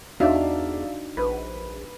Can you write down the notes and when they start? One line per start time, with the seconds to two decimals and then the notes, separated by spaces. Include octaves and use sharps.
0.20 E2 D4 D#4 F#4 D5 E5 F5
1.17 A#1 B4